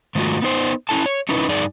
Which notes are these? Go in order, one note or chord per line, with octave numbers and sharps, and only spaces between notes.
G#2 D#3 A3 F4 F#4
B3 D#4 C5
C#4 E4 A4 A5
C#5
C#4 D#4 E4 B4
G2 D#4 G#4 D5